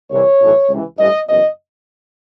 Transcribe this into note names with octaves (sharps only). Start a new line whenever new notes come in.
C2 C3 E3 C#5
B1 A2 E3
C#2 C3 E3
A1 G2 E3 D#5
F#1 E2 B2 D#5